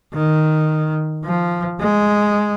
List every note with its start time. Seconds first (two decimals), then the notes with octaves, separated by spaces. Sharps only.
0.14 D#3
1.24 F3
1.80 G#3